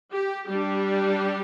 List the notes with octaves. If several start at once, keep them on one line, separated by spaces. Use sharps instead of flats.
G4
G3 D4 G4